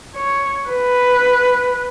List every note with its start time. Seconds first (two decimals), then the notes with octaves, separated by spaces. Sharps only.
0.16 C#5
0.68 B4